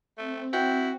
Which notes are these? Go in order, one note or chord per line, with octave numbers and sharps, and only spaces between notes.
A3 C4
E4 F#4 G5